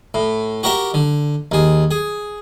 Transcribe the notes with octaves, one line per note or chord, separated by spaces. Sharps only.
A2
F#4 G4 A#4 E5
D3
D#2 G#4
G#4